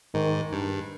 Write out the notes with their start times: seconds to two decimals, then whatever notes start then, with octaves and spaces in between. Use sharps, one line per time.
0.14 G#2 D#3
0.53 G2